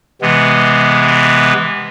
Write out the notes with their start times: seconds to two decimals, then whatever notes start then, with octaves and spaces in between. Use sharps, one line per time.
0.22 C3 E3 G#3 B3